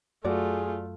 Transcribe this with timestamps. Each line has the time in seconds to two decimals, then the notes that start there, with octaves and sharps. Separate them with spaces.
0.25 F#2 A3 F4 F#4 G#4 D5